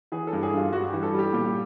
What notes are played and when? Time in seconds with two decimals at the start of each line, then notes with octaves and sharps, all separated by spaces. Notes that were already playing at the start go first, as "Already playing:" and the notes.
0.12 E3 G#4
0.27 A4
0.33 G2
0.43 G#4
0.53 G2 F4
0.72 G2 F#4
0.88 E3 G4
1.03 A4
1.14 G3 G4
1.33 A#2 G4